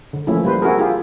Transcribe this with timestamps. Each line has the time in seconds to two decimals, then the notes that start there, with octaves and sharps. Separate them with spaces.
0.13 D3
0.27 E3 F3 A3 A#3 C#4 E4
0.45 G3 A#3 B4 C5
0.62 C4 E4 F#4 G#4 A#4
0.78 D4 E4 F4 G4 G#4